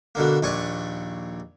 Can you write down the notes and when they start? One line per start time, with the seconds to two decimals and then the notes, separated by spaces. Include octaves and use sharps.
0.15 B2 D3 A#3
0.43 A#1 D#2 D5 G#5 C#6